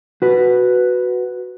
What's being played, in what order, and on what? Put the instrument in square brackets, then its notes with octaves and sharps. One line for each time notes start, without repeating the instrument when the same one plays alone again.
[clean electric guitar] F#4 B4